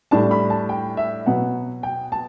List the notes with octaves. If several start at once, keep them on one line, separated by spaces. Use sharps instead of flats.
A2 G3 D4 A5
B5
A5
G5
E5
B2 F#3 B3 F#5
G5
A5